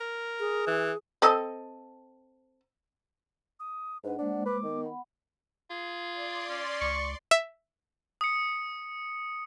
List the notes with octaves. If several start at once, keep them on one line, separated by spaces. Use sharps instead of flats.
A#4
G#4
E3
C4 A4 D#5
D#6
G#2 D4 B4 C5 F#5
G#3 A#3 D4 C5 F#5
B4 D6
D#3 B3
F#5 B5
F4 G#4
D5 C6
C#4
C#2 C#6
E5
D#6 C#7